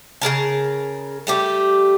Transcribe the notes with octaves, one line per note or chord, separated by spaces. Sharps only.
C#3 G#4 A#4 A5
G3 A3 G4